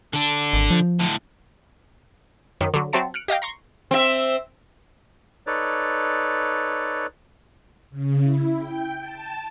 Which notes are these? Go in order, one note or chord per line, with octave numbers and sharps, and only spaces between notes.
D3 D4
G#1
F3
A2 D3
F#2 D#3
D3 F#3
F#3 C4 E5 A5 C#7
F6 F#6 C#7 D7
G4 D#5 F5 G5
A#5 C6 C#6
C4 E5
D#4 A4 B4 C#5 D5
C#3
E4
G5
A5